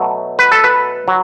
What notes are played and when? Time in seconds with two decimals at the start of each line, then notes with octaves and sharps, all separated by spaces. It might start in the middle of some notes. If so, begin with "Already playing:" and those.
Already playing: B2 F#3 A3
0.39 B4
0.52 A4
0.64 B4
1.08 F#3